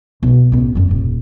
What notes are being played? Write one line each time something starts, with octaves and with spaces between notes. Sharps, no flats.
B1
A1 B3
F#2 G3
D#1